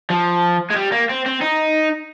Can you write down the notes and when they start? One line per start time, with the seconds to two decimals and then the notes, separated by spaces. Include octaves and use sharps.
0.10 F3
0.70 G#3
0.76 G3
0.92 A#3
1.09 C4
1.26 C4
1.41 D#4